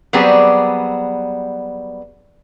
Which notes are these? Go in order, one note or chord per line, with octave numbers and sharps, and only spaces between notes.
F#3 G3 B3 C4 G#4 D5